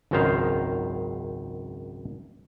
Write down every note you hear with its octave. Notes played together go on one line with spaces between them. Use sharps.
G#1 C#2 F#2 D#3 C5 F5